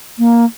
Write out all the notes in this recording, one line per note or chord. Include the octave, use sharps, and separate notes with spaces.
A#3